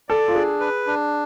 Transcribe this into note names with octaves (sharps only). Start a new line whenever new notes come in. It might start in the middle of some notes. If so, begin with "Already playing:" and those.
A4 D5
F4
D4 G#4
B4
D4